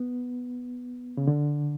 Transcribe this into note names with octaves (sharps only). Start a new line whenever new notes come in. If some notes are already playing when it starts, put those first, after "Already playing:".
Already playing: B3
C#3
D3